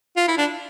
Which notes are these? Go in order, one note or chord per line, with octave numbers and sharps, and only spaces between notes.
F4
E4
D4